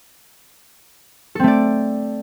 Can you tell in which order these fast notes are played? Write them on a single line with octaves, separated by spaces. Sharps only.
A4 C4 A3 D5